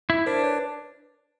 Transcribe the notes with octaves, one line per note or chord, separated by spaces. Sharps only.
E4
D4 A#4 C5
B4 C#5